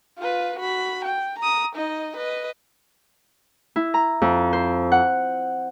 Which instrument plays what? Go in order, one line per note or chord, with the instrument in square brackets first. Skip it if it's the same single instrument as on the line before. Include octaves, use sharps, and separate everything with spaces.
[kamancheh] F4 B4
F#4 B5
G5
A#5 D#6
D#4 D#5
B4 D#5
[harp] E4
A#5
F2
C5
F#5